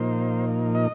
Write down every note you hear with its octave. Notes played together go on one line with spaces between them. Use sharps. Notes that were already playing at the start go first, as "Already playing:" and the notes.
Already playing: A#2 F3 A#3 D#4 C5
D#5